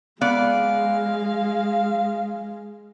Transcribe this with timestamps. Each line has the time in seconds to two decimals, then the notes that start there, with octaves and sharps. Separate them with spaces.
0.21 G#3 B3 D5 F5